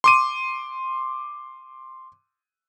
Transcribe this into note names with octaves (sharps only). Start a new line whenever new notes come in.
C6 D6 D#7